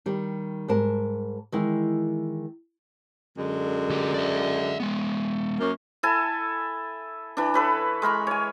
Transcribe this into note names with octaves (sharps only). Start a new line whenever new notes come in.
D#3 G3
G#2 G3 A#4 A5
D#3 E3 G#3 E4
F#2 D3 G#3
D2 G4
D5 E5
G#3 B3
F#2 A#3 C#4
E4 A4 G#5 A5
E3 D4
A4 B4 C#5
G#3 A#4 B5 C#6
C#5 G#5